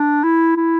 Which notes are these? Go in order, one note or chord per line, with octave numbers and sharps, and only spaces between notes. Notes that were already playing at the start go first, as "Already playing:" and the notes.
Already playing: D4
E4
E4